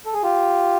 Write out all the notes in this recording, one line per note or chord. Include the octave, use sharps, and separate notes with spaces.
A4
G#4
F4 G4